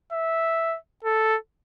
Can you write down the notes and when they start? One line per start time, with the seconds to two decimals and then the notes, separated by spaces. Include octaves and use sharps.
0.13 E5
1.04 A4